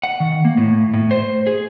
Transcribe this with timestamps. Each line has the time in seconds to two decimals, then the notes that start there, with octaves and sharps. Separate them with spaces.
0.03 F#5
0.20 D#3
0.45 A#3
0.57 A2
0.94 A2
1.11 C5
1.47 G#4